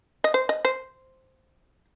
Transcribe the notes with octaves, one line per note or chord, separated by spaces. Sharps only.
D#5
C5
D#5
C5